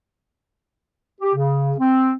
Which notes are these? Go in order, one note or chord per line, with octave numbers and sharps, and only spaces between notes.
G4
C#3
C4